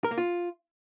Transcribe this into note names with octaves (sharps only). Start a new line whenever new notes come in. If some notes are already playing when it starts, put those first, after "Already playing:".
A#4
A#3
F4